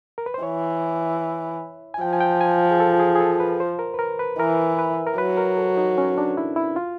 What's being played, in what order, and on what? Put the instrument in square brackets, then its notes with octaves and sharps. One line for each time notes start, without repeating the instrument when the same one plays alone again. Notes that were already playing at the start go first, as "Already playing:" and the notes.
[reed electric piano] A#4
B4
C5
[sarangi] E3 [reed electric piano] C#5
[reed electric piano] G#5
[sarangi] F3 [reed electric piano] G5
[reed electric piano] G#5
G5
G#5
G#4
A4
G#4
G#4
A4
B4
C5
A#4
B4
A#4
B4
[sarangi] E3 [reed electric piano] A#4
[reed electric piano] B4
A#4
[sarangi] F#3 [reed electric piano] B4
[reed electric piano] A#4
A4
D#4
C#4
D4
E4
E4
F4